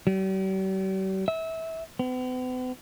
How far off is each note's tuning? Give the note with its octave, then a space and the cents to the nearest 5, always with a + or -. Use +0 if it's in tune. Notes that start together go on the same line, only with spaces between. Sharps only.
G3 -45
E5 -25
B3 +45